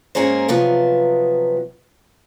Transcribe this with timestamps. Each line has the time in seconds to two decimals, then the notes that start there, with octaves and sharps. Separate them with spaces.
0.15 G#2 A#3 C#4 G#4 A#4 C5
0.48 C3 F3 F#3 B3